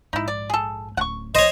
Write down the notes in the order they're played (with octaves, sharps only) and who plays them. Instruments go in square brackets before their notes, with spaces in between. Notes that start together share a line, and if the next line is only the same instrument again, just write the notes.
[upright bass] A#1 G#2 [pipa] D#4 E4
[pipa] D5
G#4 A4
[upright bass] D1 C#4 [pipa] F#5 C#6
[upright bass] B1 [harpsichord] C5 C#5 [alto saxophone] D#5